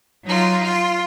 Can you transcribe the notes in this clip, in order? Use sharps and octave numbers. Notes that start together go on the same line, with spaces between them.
F#3 D#4 F4
F4